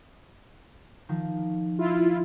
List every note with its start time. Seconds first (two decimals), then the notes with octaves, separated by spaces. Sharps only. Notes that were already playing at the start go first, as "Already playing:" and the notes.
1.09 D#3 F3
1.79 E4 F4